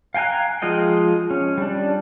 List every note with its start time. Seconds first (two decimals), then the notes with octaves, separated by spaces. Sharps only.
0.14 F5 G5 G#5 A#5 F#6
0.62 F3 G#3 F4 D#5 G5
1.31 C#4
1.58 G3 D4